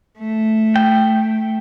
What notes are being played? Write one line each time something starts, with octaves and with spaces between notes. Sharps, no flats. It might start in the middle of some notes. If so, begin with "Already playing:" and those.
A3
G5